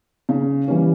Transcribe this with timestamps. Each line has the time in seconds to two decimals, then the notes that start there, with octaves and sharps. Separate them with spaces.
0.29 C#3
0.68 E3 G3 C#4